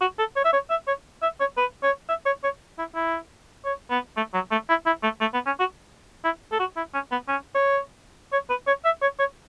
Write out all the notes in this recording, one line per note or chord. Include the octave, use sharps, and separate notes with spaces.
F#4
A4
C#5
E5
C#5
E5
C#5
E5
C#5
B4
C#5
E5
C#5
C#5
E4
E4
C#5
B3
A3
F#3
A3
E4
E4
A3
A3
B3
C#4
F#4
E4
A4
F#4
E4
C#4
B3
C#4
C#5
C#5
B4
C#5
E5
C#5
C#5